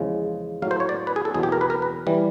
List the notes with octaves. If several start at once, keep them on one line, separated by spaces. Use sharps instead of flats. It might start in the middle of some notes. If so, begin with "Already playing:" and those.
Already playing: E2 C#3 F3 G#3
A2 F#3 F5
C5
C#5
D5
B4
G#4
A4
E2 B2 F#3 G#4
G4
A#4
B4
A#4
B4
E3 G3